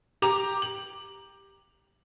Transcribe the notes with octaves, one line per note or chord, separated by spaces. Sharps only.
G4 A#5 D6 F7
F#7